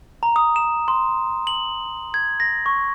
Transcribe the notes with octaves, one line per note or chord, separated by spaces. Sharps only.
A#5
D#6
E7
C6
F#7
G#6
A#6
C#6